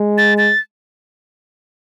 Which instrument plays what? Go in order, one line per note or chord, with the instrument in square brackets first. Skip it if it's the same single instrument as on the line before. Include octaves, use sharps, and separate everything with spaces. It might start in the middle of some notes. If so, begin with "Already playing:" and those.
Already playing: [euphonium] G#3
[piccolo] A6
A6